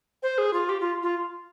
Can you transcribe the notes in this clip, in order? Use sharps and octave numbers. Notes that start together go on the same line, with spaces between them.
C5
G#4
F4
G4
F4
F4